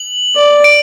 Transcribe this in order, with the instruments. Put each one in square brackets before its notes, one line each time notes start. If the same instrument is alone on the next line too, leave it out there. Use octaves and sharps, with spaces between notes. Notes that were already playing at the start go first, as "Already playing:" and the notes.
Already playing: [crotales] F#7
[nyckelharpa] D5
[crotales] D7